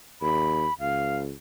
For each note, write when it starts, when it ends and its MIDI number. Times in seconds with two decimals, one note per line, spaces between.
0.21 0.66 39
0.21 0.74 83
0.80 1.33 37
0.80 1.17 77